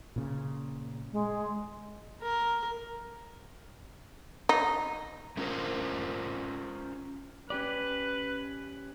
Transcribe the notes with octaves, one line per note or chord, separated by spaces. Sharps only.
A#2 C#3
G#3
A#4
D#4
A3 C#4 F4 A#4 C5
C#4 G4 B4 D5